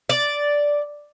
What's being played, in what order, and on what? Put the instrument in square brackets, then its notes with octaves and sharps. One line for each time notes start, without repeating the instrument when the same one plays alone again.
[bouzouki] D5